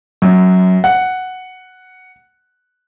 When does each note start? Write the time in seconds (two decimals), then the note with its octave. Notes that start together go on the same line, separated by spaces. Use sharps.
0.22 F#2
0.84 F#5